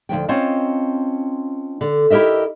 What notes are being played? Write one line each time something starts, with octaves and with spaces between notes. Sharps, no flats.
D2 G2 F3 G5
C4 C#4 F4 D#5 A5
D3
E4 G4 A#4 D#5 E5